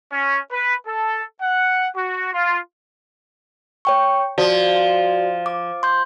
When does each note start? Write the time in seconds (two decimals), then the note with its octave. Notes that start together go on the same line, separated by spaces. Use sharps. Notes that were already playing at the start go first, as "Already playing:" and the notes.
0.12 C#4
0.52 B4
0.87 A4
1.42 F#5
1.96 F#4
2.34 F4
3.85 C#5 G5 C#6
4.38 F3 F#4 D5
5.46 D6
5.83 C6 G6